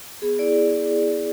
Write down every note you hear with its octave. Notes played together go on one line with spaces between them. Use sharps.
B3 G#4
E4 D5
B3